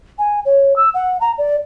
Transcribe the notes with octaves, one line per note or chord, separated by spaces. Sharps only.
G#5
C#5
E6
F#5
A#5
D5